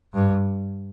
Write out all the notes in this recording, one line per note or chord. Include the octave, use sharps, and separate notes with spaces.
G2